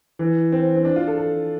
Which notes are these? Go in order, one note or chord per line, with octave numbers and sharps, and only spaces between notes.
E3
C4
C4
D4
F4
A4
A4